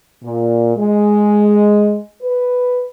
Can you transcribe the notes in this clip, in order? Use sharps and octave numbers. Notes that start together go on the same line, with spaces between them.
A#2
G#3
B4